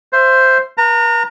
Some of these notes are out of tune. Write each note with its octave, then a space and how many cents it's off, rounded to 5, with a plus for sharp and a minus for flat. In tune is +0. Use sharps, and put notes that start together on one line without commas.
C5 +0 E5 +30
A#4 +45 A#5 -30